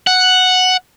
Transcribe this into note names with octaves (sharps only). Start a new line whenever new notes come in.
F#5